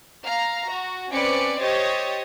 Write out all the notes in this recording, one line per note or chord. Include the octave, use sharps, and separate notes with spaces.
F5 A#5
F#4
C4 C#4 B4 D5 D6 C#7
G4 C5 C#5 D#5 D#6 A6